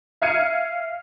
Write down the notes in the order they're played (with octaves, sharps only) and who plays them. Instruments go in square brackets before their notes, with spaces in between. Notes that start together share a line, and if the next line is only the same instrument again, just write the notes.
[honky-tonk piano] E5 F5 F6 G#6 C#7 D#7